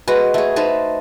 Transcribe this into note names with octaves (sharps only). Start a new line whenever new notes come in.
G#3 F#4 B4
A3 G#4
D#4 B4 C5 A5